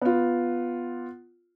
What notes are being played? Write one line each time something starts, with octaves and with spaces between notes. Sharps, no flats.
B3 F4